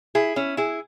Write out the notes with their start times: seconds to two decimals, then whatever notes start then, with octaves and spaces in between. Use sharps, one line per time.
0.15 E4 G#4
0.36 C#4 E4
0.57 E4 G#4